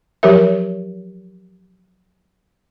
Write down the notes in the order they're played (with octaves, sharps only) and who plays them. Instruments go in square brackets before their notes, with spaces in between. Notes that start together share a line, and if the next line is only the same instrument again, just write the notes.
[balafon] F3 F#3 G4 A#4 E5